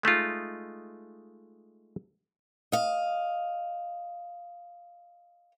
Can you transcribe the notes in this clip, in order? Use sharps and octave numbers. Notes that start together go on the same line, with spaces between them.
G#3 A3 D#4 F4
D#5 F5